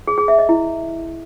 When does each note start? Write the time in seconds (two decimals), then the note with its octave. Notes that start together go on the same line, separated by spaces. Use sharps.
0.07 G#4
0.18 G#4
0.28 E5
0.39 D#5
0.49 E4